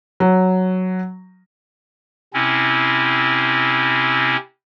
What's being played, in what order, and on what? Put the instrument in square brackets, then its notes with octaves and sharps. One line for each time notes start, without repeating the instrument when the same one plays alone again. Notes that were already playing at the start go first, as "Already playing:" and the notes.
[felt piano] F#3
[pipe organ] C3 C4 C#4 E4